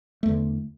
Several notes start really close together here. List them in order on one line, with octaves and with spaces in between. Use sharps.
A3 E2 D3